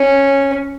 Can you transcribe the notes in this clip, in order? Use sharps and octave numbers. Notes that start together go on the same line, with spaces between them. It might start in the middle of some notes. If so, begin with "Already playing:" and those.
Already playing: C#4